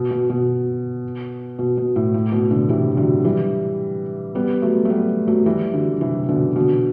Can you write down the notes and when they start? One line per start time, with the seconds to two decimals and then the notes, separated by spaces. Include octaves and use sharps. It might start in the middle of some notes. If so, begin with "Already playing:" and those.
Already playing: B2
0.11 B2
0.30 B2
1.59 B2
1.78 B2
1.96 A2
2.14 A2
2.32 B2
2.51 B2 D3
2.69 C3 E3
2.97 D3 F#3
3.24 E3 G3
4.35 G3 B3
4.62 F#3 A3
4.85 A3
4.90 G3 B3
5.28 F#3 A3
5.46 E3 G3
5.73 D3 F#3
6.01 C3 E3
6.29 B2 D3
6.56 B2 D3